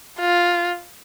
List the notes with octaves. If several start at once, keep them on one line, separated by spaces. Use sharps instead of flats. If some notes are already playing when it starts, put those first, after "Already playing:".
F4